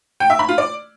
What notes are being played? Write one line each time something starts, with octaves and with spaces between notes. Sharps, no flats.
G5
E5
B5
F4
D5